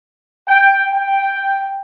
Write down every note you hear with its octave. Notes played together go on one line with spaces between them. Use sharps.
G5
G5